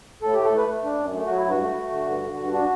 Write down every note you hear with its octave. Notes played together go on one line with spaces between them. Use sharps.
A2 A4
A3 G4
A4
A3 B4
A3
D4
F#2
A3
F#3 F#4
E4
G2 F#4
A3
A3
D3
G2
D3
G2
D4 F#4